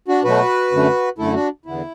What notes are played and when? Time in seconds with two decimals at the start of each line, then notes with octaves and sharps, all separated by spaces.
0.08 D4 F#4
0.24 B2 F#3 A3 F#4 B4
0.71 F#2 D3 A3
1.18 F#2 D3 A3 E4 A4
1.34 D4 F#4
1.65 E2 D3 B3 E4